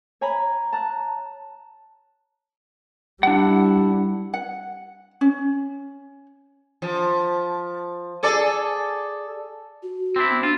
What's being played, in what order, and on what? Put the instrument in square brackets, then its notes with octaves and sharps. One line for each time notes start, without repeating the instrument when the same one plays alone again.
[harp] C#5 G#5 A#5 B5
A5 A#5 F#6
[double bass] G3 E4 [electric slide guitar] D4 F#5
[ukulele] F#5
C#4
[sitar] F3
G#4 A4 D5
[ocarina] F#4
[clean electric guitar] C4 D4 E4
[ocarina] B3
[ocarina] D4 [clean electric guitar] F4